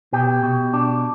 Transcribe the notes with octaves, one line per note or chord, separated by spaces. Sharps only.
B2 G4
B2
D4